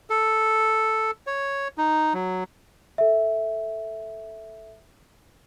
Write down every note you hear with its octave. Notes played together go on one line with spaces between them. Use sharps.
A4
C#5
D#4
F#3
A4 E5